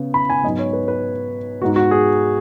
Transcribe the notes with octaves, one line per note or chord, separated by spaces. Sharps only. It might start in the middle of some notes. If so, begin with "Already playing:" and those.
Already playing: C#3 B3
B5
G#5
G#2 F#3 B3 D#5
C#5
B4
B4
G#2 G#3 B3 F#4
F#4
G#4